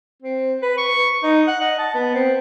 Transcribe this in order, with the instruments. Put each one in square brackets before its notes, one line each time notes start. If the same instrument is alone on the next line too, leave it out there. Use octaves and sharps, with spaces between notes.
[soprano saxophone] C4
B4
C#6
D#4
F#5
D#5
A5
B3
C4